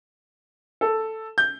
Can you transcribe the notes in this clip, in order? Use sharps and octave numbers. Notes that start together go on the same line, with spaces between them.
A4
G6